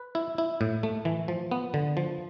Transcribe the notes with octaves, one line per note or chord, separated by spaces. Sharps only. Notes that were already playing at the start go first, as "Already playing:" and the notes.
Already playing: B4
E4
E4
A2
A3
E3
F3
B3
D3
F3